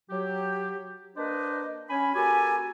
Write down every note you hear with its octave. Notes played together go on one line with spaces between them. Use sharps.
F#3 G4
A#3 D4 B4 C5 D5 D#5
C#4 G#5 B5
A#3 F#4 G4 A4 G#5